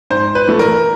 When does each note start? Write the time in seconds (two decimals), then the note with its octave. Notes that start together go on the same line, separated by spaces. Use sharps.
0.10 G#2 C5
0.35 B4
0.47 E3 A3
0.59 A#4